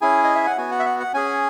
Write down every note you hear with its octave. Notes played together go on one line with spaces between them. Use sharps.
C#4 E4 G#4 G#5
D#5
E5
F#5
B3 F#4 G#5
F#5
E5
F#5
F#5
C#4 G#4 G#5